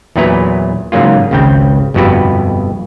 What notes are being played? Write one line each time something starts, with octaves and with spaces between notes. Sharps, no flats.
E2 A#2 F#3 E4 B4 A#5
G#2 C#3 F#3 A#3 F4
G#1 C#2 C#3 C4 G5
G1 F2 B2 F#4 G4 B4